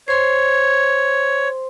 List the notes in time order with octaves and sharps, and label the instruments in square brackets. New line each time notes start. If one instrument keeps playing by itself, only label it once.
[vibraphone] C5 C6 [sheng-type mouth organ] C#5